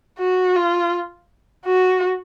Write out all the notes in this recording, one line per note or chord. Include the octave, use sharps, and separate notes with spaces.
F#4
F4
F#4